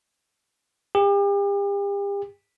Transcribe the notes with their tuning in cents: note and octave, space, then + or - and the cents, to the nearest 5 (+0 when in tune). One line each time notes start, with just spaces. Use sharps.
G4 +40